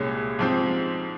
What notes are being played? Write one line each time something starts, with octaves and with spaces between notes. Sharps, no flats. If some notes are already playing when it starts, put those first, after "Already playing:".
Already playing: C2 A#2 G#3 C#4
G#2 F3 C4